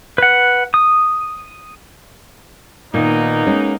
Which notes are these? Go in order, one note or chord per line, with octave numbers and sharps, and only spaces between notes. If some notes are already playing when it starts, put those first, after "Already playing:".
B4 F#5
D#6
A#2 D#3 A#3 B3 D#4
G#3 C#4